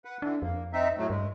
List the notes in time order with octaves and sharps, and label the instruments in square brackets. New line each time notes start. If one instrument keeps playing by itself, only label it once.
[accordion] B4 F#5
[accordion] D3 E3 [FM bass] D4
[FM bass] F2 [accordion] A#3
[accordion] C4 D#4 E5
A2 F#3 A3
[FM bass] G2 [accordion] G#3